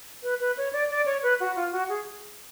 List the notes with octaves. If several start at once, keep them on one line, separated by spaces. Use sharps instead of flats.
B4
B4
C#5
D5
D5
C#5
B4
F#4
F4
F#4
G#4